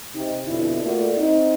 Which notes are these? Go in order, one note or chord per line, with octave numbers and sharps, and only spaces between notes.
C3 D#4 G4
F2 B2 D3 E4
A2 A3 A#3 F4 F#4 D5
C4 D#4